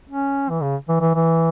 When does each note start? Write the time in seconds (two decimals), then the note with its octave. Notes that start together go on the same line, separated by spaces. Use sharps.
0.10 C#4
0.50 E3
0.62 C#3
0.89 E3
1.01 E3
1.15 E3